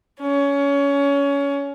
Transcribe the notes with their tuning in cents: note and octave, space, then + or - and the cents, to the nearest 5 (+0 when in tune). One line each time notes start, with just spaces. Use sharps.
C#4 +20